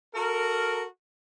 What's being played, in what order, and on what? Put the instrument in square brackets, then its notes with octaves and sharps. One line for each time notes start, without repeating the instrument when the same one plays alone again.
[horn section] F#4 A4 A#4